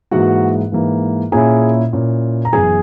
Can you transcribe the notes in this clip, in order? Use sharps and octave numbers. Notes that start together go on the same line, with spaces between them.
G#2 E3 A#3 F#4 F#5
G#2 E3 A#3
A#2 A#3 C#4 E4 G#4 G#5
A#2 A#3 C#4 E4
A#5
F#1 F#2 E3 B3 G#4 G#5